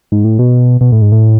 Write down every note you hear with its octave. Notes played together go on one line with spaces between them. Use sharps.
G#2
A2
B2
B2
A2
G#2
A2